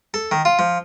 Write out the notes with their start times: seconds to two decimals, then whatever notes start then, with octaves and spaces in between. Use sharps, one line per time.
0.14 A4
0.31 D#3
0.45 F4
0.59 F3